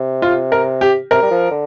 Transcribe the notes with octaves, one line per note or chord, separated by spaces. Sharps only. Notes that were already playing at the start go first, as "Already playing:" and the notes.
Already playing: C3
F4
A#4
G4
C3 A#4
G3
F3
D3